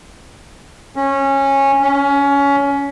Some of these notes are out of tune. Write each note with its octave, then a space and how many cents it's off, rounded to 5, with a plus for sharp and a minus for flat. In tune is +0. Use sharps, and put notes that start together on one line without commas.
C#4 -15
C#4 +20